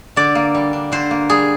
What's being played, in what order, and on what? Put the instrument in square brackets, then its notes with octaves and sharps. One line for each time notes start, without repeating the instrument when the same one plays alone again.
[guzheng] D3 D5
A#3
G3
D4
D3 C5
A#3
G3 G#4